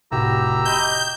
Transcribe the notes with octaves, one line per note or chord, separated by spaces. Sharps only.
F1 A2 F#4 G4 A#5 E6
D#5 B5 D#6 G6